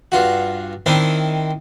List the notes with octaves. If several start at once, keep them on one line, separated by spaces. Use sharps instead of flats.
G2 F4 F#4
D#3 C4 D4 E4 C5